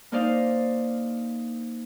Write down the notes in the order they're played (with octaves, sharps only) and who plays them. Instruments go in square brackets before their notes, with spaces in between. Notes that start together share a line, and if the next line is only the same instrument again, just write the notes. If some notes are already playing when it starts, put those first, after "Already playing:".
[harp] A#3 D4 D#4 C5 D5 F5